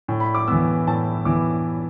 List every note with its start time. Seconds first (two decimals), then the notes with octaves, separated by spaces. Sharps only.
0.08 A2
0.20 B5
0.35 D6
0.48 E3 B3 E6
0.87 A2 A5
1.25 E3 B3 D6